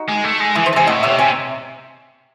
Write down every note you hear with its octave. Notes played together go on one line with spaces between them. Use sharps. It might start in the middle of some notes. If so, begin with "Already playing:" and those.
Already playing: D#4 F#4
G#3
A3
G#3
E3 E4 G#4
C5 D#5
A5
C3 E5 G#5
A2 D#5 F#5
C3 C#5 E5
C3 E5 G#5